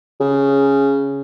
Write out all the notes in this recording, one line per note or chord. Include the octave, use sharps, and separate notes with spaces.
C#3